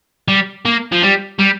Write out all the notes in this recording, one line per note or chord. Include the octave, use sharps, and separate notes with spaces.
G3
A#3
F3
G3
G3